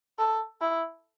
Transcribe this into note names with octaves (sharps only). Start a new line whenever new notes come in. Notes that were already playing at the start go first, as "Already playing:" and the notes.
A4
E4